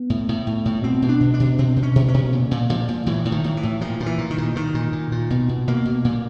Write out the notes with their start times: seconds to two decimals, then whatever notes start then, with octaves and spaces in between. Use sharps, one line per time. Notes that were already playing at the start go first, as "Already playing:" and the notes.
Already playing: B3
0.10 A2
0.29 A2
0.47 A2
0.65 A2
0.84 B2 C4
1.02 B2
1.09 D4
1.20 B2
1.34 D4
1.40 B2
1.58 B2 C4
1.76 B2
1.83 C#4
1.96 B2
2.08 C#4
2.14 B2
2.33 A#2
2.51 A#2
2.70 A#2 F3
2.89 A#2
3.06 A2 E3
3.25 A2
3.32 D#3
3.44 A2
3.57 E3
3.63 A2
3.81 A#2 F3
4.00 A#2
4.06 E3
4.18 A#2
4.30 D#3
4.38 A#2
4.55 A#2 D#3
4.75 A#2
4.92 A#2
5.12 A#2
5.30 B2
5.49 B2
5.67 B2 A#3
5.85 B2
6.05 A#2